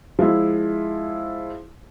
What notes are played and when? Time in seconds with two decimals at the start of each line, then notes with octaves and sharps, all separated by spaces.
0.19 F3 G#3 E4